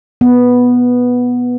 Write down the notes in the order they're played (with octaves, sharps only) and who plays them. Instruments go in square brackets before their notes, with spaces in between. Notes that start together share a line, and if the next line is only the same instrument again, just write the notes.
[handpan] B3